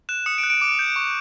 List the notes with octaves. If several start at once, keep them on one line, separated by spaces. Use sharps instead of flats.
F#6 E7
D#6 C#7
D7
F#6
D7
D6
G6
C#6